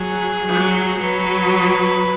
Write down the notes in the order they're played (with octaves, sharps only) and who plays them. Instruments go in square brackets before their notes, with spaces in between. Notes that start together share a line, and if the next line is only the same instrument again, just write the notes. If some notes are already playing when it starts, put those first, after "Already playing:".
Already playing: [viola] F#3 [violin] G#4
[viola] F#3
[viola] F#3 [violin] B4